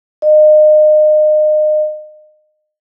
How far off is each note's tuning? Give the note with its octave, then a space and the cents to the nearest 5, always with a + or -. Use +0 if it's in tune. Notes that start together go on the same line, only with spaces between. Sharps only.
D#5 -30